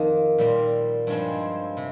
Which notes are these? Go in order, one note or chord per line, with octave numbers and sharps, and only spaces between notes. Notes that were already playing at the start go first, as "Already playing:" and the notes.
Already playing: F2 D#3 A#3
A#2 G3 C4
G2 F3 G#3 C4
C3